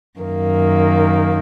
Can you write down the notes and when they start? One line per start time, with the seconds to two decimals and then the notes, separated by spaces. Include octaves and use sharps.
0.19 F#2 D#3 A#3